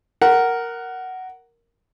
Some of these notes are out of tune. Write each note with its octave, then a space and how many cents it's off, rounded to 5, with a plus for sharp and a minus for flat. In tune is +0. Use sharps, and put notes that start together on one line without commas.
A#4 +0 F#5 +10